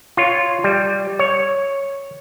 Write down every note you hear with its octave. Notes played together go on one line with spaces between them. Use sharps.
F4 C#5
G3
C#5